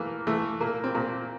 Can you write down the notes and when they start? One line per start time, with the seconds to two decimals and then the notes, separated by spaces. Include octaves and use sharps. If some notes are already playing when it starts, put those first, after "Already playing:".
Already playing: E3 A3 A#3
0.27 E3 A3
0.60 A#2 A#3
0.84 C4
0.95 A#2